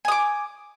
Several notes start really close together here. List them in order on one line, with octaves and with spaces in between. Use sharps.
G#5 D#6 D6